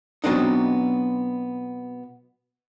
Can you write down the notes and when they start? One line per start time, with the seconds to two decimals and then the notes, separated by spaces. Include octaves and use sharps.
0.24 B2 F#3 B3 C4 D4 D#4